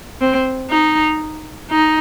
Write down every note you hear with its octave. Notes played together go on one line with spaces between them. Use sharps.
C4
D#4
D#4